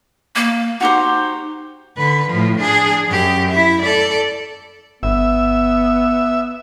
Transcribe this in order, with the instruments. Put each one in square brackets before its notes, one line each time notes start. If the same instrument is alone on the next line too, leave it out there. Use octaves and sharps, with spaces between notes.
[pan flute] A#3
[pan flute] D#4 [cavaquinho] F#4 G4 C5
[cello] D3 B4
A2 F3
D4 G#4
F#2 G4
E4 E5
A4 D5
[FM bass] G1 [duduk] B3 [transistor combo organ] E5